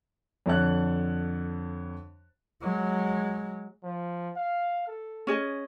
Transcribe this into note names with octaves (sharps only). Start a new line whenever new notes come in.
F2 D3 C#5 A5 F#6
F#3 G#3
F3
F5
A4
C#4 G#4 D#5